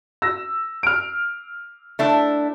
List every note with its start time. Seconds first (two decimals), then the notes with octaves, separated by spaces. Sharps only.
0.22 E6 A#6
0.83 F6 D7
1.99 A3 D4 E4